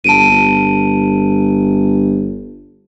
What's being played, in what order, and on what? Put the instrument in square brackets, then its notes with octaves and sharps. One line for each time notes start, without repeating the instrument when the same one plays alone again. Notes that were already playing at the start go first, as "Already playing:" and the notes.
[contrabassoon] G1 [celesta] A5 D7 D#7
[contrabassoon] G1